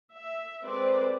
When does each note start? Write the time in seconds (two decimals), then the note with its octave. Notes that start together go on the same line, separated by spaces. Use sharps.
0.13 E5
0.63 G#3 C4 A4 B4 C5 D5